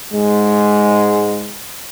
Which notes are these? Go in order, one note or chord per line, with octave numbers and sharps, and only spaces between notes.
G#2 G#3